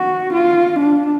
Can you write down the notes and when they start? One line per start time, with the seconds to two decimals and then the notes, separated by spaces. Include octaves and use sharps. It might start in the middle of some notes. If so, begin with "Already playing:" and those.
Already playing: F#4
0.34 F4
0.80 D4